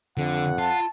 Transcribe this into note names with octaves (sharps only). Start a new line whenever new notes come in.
F2 D3 F#5
F4 A5